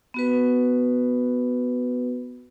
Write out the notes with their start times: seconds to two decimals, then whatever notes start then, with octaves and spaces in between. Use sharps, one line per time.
0.14 B3 F#4 B4